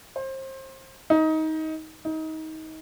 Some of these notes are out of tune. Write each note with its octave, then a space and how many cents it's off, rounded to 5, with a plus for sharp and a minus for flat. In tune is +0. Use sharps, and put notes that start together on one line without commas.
C5 +30
D#4 +20
D#4 +25